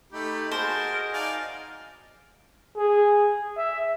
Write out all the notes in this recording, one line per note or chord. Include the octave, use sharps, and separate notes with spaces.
A3 D#4 G4 B5
F#4 G#4 A#4 C5 D#5 A5
D#4 D5 F5 G#5
G#4
E5